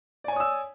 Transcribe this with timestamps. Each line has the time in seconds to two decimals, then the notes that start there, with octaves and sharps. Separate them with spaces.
0.24 D5
0.28 G#5
0.32 C#5
0.36 D#6
0.40 E6